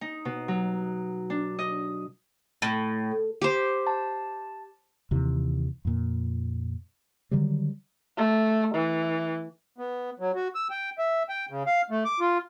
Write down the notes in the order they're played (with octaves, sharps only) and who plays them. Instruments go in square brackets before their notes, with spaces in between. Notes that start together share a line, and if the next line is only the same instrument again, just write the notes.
[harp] D#4
B2
F#3
D4
D#5
[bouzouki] A2
[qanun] G4 C5
[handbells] A5
[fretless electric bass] D#2 C3 E3
F2 A#2
D3 D#3 F#3 G3
[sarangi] A3
E3
[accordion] B3
F#3
F#4
E6
G5
E5
G5
C#3
F5
A3
D6
F4